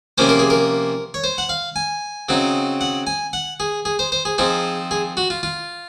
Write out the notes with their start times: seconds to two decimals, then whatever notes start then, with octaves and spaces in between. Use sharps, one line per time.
0.18 C3 F3 A#3 C#4 C5
0.29 A#4
0.39 G#4
0.50 A#4
1.14 C#5
1.24 C5
1.38 F#5
1.49 F5
1.76 G#5
2.29 C#3 F#3 C4 D#4
2.81 F#5
3.07 G#5
3.33 F#5
3.60 G#4
3.85 G#4
3.99 C5
4.12 C5
4.25 G#4
4.38 F3 C4 D#4 G#4
4.91 G#4
5.17 F#4
5.30 F4
5.43 F4